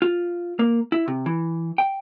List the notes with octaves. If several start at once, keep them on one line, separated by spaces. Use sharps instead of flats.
F4
A#3
E4
C3
E3
G5